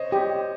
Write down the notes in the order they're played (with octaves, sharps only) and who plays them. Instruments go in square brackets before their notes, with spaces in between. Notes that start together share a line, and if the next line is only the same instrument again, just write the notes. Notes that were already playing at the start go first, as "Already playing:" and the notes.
Already playing: [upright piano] C5 C#5 D#5
[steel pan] G4 [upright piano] D#5